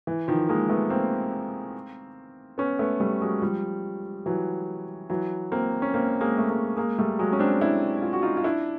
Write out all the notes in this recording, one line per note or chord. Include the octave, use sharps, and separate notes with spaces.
E3
D#3 F3
G#3 A#3
A3 B3
A#3 C4
B3 C#4
A3 B3
G3 A3
F#3 G#3
F3 G3
E3 F#3
E3 F#3
A#3 C4
C#4
A#3 C4
G#3 A#3
A3
G#3 A#3
G#3 A#3
G3 A3
F#3 G#3
C#4
C4 D4
D4 E4
F4
F#4
D#4 F4
F4
D4 E4